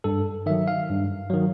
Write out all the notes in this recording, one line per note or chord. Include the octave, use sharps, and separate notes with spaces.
G2 A4
D#3 F#3 E5
F5
G2
D#3 F#3